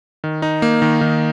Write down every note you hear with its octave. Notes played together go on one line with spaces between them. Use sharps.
D#3
D#4
A#3
D#3
D#3